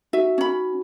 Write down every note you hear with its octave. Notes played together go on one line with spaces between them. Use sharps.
D#4 F#4 E5
C#4 B5